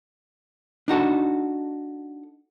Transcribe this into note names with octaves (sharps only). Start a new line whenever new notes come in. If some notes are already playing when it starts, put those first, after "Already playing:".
D4 D#4 F#4 A4